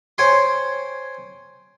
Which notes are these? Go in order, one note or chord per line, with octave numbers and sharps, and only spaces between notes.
C5 C#5 G5 G#5 C6